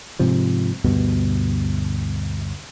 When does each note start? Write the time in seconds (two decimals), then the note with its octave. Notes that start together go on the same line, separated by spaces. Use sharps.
0.19 G#2 C3 F3
0.84 D2 G2 B2